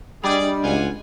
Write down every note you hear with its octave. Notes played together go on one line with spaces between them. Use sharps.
G3 D4 G#4 D5 D#5
C#2 F4 F#5 G#5